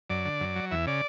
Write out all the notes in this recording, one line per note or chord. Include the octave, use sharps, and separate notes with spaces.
F#2 D5
D3
F#2
F#3
E2 E5
C#3 D5